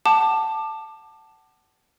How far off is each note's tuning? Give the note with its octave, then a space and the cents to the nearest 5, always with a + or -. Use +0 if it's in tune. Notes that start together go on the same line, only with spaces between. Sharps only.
F#5 +30 A5 +0 D6 +25